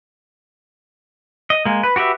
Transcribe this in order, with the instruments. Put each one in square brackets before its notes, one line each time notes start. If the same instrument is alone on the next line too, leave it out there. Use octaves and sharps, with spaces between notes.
[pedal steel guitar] D#5
G#3 A#3
B4
F#4 G4 B4 E5